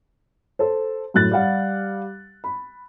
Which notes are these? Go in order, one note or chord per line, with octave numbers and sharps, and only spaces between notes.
A4 C5
F#2 A2 F#6 A6
G3 G4 F5 F#5
B5